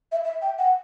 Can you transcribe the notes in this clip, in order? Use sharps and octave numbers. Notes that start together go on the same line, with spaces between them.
E5
E5
G5
F#5